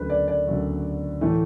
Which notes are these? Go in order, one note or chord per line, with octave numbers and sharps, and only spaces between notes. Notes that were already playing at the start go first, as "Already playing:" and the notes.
Already playing: D2 C#3 F#3 B4
D5
D5
D2 C#3 F#3
A2 E3 A3